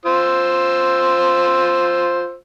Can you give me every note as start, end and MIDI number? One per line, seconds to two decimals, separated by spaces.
0.05 2.35 65
0.05 2.35 72
0.05 2.35 88